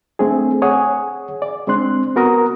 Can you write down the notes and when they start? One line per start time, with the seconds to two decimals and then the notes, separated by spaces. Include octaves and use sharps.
0.19 A3 C4 D4 G#4
0.62 G#4 C#5 F#5 G#5 D#6
1.42 D5
1.67 G#3 C4 D4 C6 F#6
2.16 B3 F#4 A#4 A#5 D#6